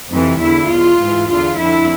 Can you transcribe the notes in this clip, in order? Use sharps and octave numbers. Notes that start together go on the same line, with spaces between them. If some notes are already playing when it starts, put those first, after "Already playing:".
F2 C3 E3
E2 D3 E4
E2 B2 F4
G#2 E3
E2 D3 F4
F2 D3 E4